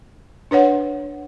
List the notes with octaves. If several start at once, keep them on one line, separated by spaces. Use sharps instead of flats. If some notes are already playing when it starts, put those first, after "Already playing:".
D4 B4 C#5 F#5